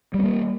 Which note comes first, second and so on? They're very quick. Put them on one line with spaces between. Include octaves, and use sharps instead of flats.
G3 C4 A#3